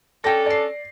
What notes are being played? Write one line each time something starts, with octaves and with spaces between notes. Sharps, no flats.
C#4 D4 A4 G5 A#6
D5 C7